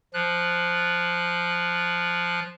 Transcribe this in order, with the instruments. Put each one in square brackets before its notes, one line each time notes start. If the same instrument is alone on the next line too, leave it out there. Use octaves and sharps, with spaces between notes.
[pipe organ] F3 F#6